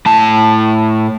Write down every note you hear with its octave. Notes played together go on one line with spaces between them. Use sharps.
A2 A5